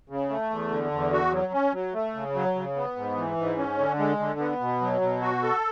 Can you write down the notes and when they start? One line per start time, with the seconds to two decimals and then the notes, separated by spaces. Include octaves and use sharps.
0.10 C#3
0.30 A3
0.50 E2
0.71 D3
0.91 E2
1.12 F#4
1.33 F#3
1.53 C#4
1.73 F#3
1.94 A3
2.14 C#3
2.35 F#3
2.56 C#3
2.76 B3
2.96 G#2
3.17 E3
3.37 G#2
3.58 C#4
3.79 D3
3.99 G#3
4.19 D3
4.39 B3
4.61 B2
4.81 F#3
5.01 B2
5.21 F#4
5.43 A4